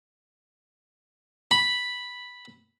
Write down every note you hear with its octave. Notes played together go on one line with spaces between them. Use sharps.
B5